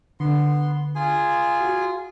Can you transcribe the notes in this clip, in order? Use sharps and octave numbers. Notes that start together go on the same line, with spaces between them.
D3 B3 C6
F4 G#4 G#5
F#4